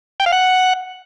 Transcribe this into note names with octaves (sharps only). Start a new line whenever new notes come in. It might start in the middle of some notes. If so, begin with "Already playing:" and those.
G5
F5
F#5